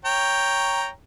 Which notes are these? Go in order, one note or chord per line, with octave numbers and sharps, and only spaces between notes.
C#5 G5 A#5